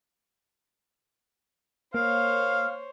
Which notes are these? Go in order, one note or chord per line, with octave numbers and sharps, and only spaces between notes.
A#3 C5 C#5 F5